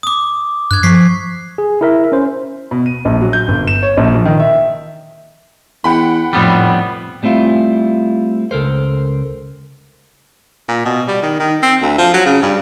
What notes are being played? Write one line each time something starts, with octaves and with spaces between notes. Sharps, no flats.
D6 D#6
G2 F#6 G#6
F3 C#6 B6 C7
G#4
E4 A#4 E5
C#4 C5
B2
D#7
A#1
F#3
G6
G1
E7
C#5
A#1
F3
D#3
E5
E2 F#5 G5 B5
F1 F2 A2 G3 B3
G3 A3 C4 E4 F4
C#2 A4 A#4 C5
A#2
B2
G3
D#3
D#3
C4
D2
F3
F#3
C#3
G2